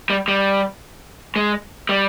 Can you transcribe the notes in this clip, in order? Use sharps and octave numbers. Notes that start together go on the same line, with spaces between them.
G3
G3
G#3
G3